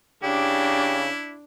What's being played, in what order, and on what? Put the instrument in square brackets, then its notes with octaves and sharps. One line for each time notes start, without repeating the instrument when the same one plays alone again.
[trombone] C#3 [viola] D4 [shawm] E4 [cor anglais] G4